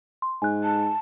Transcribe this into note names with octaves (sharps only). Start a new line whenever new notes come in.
C6
G#2 G#5 F#6
A5